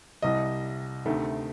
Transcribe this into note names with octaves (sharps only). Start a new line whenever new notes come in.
C2 C3 G3 D#5
D2 C3 D#3 A3